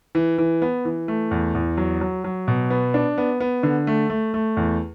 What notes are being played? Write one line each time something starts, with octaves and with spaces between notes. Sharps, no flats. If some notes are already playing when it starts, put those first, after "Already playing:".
E3
E3
B3
E3
A3
E2
E2
F#3
F#3
F#3
B2
B3
D4
B3
B3
D3
A3
A3
A3
E2